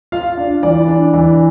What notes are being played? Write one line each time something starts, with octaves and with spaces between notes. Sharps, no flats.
F4 F5
D4
E3 D5
D4
E3